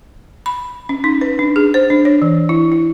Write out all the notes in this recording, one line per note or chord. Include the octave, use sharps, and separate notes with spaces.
B5
C#4
D#4
B4
D4
G#4
C5
D4
C#5
E3
E4
E4